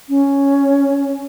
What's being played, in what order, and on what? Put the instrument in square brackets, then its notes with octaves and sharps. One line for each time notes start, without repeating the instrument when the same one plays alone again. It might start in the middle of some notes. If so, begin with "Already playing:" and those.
[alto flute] C#4